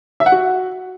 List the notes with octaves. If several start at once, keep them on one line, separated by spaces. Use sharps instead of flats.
E5
F#5
F#4